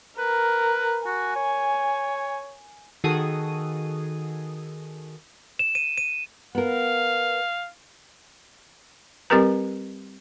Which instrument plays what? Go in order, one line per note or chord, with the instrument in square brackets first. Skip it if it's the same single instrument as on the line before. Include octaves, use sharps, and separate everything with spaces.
[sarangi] A#4 [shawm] B4
[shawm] F#4 [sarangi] G#5
[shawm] C#5
[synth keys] D#3 F#4 G#4 A4 D#6
[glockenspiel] E7
D#7
D#7
[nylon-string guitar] B3 A#4 [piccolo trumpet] F5
[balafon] G3 C4 G4 A#4 B4 A#5